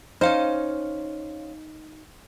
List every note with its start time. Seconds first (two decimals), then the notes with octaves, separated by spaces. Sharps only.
0.21 C#4 D#4 C5 F5 F6